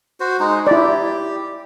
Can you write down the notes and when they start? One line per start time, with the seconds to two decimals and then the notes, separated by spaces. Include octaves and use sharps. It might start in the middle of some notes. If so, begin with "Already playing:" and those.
0.20 F#4 C5
0.39 G#3 D#4
0.67 E4 G4 D5